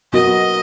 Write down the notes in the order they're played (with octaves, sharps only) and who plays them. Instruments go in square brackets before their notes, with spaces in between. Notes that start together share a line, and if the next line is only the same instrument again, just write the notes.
[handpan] F#3 B3 F#4 A#4 [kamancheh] D#5